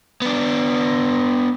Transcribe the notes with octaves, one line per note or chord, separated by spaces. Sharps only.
B3 D4